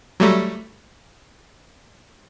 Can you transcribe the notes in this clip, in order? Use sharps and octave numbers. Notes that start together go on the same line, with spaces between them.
F#3 G3 A3